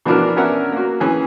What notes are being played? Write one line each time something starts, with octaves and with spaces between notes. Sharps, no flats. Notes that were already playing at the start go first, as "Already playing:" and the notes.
B2 E3 F3 D4 F#4 A#4
B3 C#4 D4 A#4 E5 F#5
A#3 F#4
E3 C#4 G#4